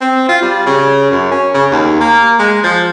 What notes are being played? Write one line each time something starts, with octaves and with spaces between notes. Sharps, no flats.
C4
F4
G3
C#3
F#2
C#4
C#3
D#2
A#3
G#3
F3